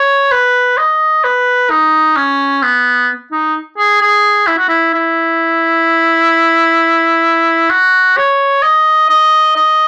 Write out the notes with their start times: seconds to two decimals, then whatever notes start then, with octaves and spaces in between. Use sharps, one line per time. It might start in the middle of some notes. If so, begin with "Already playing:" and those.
Already playing: C#5
0.31 B4
0.78 D#5
1.24 B4
1.70 D#4
2.16 C#4
2.63 B3
3.32 D#4
3.78 G#4
4.01 G#4
4.47 E4
4.58 F#4
4.68 E4
4.94 E4
7.70 F#4
8.17 C#5
8.63 D#5
9.09 D#5
9.55 D#5